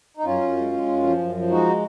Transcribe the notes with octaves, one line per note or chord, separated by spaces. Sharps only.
D#4
F#2 C#4 F4
F#2
G#3
G#3
F#2
F3
F#2
F3
G#3 D#4 F#4